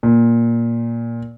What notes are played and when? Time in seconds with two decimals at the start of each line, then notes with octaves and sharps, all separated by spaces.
0.03 A#2